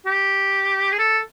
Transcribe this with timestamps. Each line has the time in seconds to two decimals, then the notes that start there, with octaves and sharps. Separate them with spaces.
0.06 G4
0.93 G#4
0.99 A4